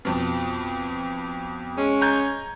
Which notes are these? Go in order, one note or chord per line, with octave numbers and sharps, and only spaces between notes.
F2 B2
G#3 C#4
A#5 G6 G#6